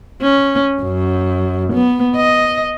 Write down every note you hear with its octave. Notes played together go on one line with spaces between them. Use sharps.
C#4
F#2
B3
D#5